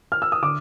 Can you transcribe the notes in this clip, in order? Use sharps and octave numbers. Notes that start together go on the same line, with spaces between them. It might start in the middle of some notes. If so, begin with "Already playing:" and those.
F6
E6
D#6
D3 D6